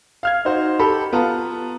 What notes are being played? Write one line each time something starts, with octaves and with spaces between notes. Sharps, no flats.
F5 F6 G#6
D#4 F#4 C5
G4 A4 B5
B3 F4 A5 A#5